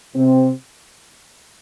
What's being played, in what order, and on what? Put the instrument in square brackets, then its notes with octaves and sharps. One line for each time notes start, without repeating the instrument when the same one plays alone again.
[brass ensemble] C3 C4